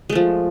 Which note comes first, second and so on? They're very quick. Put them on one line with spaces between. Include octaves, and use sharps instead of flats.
G#3 A3 F3